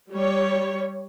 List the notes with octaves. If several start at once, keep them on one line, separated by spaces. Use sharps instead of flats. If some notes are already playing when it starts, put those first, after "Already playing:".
G3 C#5